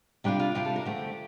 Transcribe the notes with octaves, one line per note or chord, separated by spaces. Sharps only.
C3 G3 D4 F4 G4
F4
C3 G3 D4 F4 G4
A4
A#4
D3 F3 A3 G4